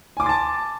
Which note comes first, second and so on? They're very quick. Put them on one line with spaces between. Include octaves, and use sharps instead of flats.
G#5 D6 C6 A6 A5